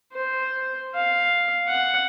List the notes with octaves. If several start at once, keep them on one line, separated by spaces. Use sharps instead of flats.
C5
F5
F#5